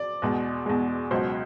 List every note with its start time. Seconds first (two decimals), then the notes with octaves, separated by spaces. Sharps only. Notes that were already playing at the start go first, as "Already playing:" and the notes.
Already playing: D5
0.22 E2 B2 G#3
0.66 E2 B2 G#3
1.11 C#2 B2 F#3 C5